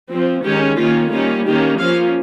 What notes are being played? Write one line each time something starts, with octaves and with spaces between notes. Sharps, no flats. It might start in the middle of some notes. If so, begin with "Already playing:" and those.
F3 C4
D#3 G#3 C#4 G4
D#3 A#3 C#4 F4
D#3 G3 A#3 C#4 F4
D#3 A#3 C#4 G4
F3 A#3 C#4 F5